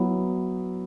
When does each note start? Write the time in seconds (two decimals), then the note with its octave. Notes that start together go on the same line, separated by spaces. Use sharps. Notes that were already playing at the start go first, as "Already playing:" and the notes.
Already playing: F#3 B3 E4